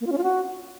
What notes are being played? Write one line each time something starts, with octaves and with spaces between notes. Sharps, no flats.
A#3
F4
C#4
F4
F#4